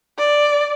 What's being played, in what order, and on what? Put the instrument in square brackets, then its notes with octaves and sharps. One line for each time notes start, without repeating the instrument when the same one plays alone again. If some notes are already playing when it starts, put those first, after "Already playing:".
[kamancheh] D5